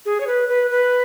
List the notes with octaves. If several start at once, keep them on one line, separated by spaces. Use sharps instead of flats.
G#4
C#5
B4
B4
B4